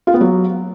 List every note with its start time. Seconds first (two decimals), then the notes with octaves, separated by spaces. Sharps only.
0.07 F4
0.14 B3
0.21 F#3